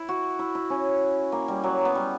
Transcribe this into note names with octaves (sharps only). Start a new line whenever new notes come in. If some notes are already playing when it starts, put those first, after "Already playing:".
Already playing: E4
F#4
E4
E4
C#4
A#3
G3
F#3
B3
G3